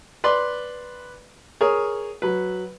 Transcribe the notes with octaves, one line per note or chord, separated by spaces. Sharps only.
B4 D5 C6
G#4 A#4 C#5
F#3 B4